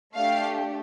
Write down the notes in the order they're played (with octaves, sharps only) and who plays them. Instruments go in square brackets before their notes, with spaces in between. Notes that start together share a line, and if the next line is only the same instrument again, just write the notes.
[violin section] A3 D4 G4 F5